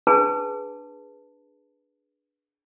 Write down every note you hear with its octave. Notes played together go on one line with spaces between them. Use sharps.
D4 G#4 B4 A5